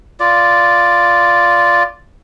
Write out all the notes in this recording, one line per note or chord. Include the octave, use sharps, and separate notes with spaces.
F4 D5